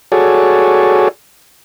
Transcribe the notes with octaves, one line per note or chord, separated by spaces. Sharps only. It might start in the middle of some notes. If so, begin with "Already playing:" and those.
F#4 G#4 A4 C#5 D5